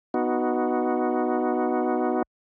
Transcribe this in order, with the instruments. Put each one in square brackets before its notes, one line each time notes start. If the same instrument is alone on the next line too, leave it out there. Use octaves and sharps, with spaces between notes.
[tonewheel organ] B3 D#4 F#4